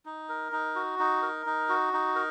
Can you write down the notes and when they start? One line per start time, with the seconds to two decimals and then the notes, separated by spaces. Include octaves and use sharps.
0.06 D#4
0.29 A#4
0.52 D#4
0.75 F#4
0.99 D#4
1.22 A#4
1.46 D#4
1.69 F#4
1.93 D#4
2.16 A#4